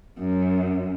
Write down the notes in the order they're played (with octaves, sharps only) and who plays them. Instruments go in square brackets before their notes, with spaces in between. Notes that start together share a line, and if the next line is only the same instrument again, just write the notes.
[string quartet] F#2